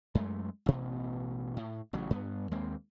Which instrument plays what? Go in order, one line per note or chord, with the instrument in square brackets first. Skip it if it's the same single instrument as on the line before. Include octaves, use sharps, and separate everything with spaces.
[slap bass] F#2 G#3 A3
A1 B2
A2
A1 C#3 F#3
G2 B3
D#2 G#3 A#3 C4